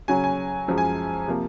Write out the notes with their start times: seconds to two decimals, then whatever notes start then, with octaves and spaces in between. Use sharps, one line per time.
0.08 C#3 F#3 C#4 G#5
0.24 G#5
0.68 F#2 F3 G#3
0.78 G#5
1.27 C3 F3 A#3